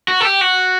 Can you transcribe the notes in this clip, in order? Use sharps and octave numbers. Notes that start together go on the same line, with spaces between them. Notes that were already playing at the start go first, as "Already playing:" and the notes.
F#4
A4
G4
F#4